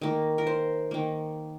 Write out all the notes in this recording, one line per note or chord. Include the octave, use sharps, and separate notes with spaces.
D#3 A#3
A#4
C5
D#3 A#3